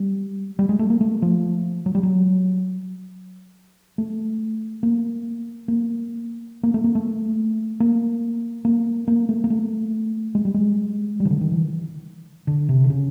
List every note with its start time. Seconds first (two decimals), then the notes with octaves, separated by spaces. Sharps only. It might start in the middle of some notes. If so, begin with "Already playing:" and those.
Already playing: G3
0.59 G3
0.69 G#3
0.79 A3
0.90 A#3
1.01 A3
1.22 F3
1.86 F#3
1.95 G3
2.03 F#3
3.98 A3
4.83 A#3
5.68 A#3
6.63 A#3
6.74 A3
6.84 A#3
6.95 A3
7.80 A#3
8.65 A#3
9.08 A#3
9.29 A3
9.44 A#3
9.50 A3
10.35 G#3
10.45 G3
10.54 G#3
11.20 G3
11.25 D#3
11.31 D3
11.41 D#3
11.52 E3
12.47 D3
12.69 C3
12.84 D3
12.90 C#3